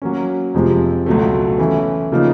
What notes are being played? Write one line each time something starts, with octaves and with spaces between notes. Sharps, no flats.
F#3 A#3 C#4
F2 C3 F3 G#3
C#2 B2 F#3 A3
E3 A3 C#4 E4
C#3 F3 A#3 D#4